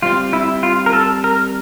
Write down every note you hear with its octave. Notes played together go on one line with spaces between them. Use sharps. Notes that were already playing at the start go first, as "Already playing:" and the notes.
G3 C4 F4 G4
E4
F4
A#4
A4
A#4